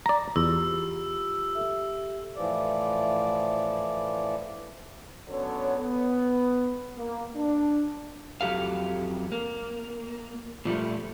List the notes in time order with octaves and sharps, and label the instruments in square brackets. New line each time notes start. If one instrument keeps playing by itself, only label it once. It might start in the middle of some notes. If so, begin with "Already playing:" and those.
[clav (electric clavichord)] D5 A#5
[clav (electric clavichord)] E2 [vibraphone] F4 G4 B5 [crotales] E6
[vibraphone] G4 A4 E5
[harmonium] A2 E3 F3 D5
[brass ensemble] D3 F#3 B3 C#4 A4 C#5
B3
A#3
D4
[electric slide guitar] F2 F#3 G4 A4 F5
A#3
A#2 F3 G3 A3